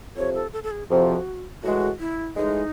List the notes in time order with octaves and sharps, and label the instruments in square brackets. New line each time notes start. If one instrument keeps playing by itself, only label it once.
[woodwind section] F2 C3 F3 [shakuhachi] C#5
[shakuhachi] A4
A4
A4
G#4
[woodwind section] F2 C3 F3 [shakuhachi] F#4
[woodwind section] A2 E3 G#3 [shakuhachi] F#4
[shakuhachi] E4
[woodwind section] A2 E3 G#3 [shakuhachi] D#4